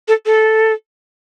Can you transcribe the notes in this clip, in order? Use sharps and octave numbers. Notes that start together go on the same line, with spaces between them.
A4
A4